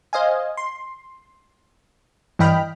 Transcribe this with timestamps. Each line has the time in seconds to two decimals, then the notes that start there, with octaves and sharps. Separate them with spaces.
0.13 C5 D#5 F5 G#5
0.57 C6
2.39 G2 E3 D#5 G5 B5 F6